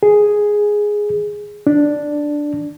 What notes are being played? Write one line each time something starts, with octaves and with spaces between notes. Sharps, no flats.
G#4
D4